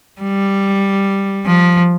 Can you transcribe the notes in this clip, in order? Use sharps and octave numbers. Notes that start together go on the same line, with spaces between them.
G3
F3